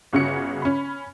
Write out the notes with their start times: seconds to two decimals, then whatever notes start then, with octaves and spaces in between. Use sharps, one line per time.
0.13 G1 C#3 C#4 F#4 C#7
0.62 C#4 B5